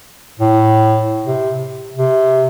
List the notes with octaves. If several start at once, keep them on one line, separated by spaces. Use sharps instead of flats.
A2
C3
C3